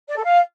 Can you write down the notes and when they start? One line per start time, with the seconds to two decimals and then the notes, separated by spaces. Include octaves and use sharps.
0.08 D5
0.16 A4
0.24 F5